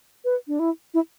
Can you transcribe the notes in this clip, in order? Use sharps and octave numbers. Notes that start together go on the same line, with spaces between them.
B4
D4
E4
E4